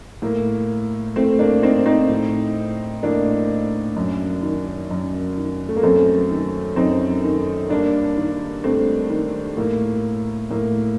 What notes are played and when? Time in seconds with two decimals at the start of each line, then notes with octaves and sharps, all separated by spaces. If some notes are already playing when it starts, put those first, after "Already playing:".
0.22 A2 A#3
1.16 A2 A3 C4
1.39 A#3 D4
1.62 C4 D#4
1.86 C4 D#4
2.10 A2
3.03 A2 A#3 D4
3.96 F#2
4.43 D#3
4.91 F#2
5.37 D#3
5.69 A3
5.76 A#3
5.83 F#2 A3 C4
6.31 D#3
6.76 F#2 C4 D#4
7.24 D#3
7.70 G2 A#3 D4
8.17 D#3
8.64 G2 A3 C4
9.10 D#3
9.57 A2 A#3
10.51 A2 A#3